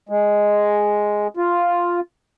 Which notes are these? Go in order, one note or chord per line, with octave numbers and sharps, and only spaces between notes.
G#3
F4